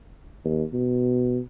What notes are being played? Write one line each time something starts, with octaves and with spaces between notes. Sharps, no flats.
D#2
B2